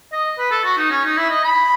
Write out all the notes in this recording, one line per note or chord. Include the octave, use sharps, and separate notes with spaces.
D#5
B4
A4
F#4
D#4
C#4
D#4
E4
D#5
B5